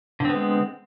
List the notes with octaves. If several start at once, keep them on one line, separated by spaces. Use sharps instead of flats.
D3 G#3 B3 C4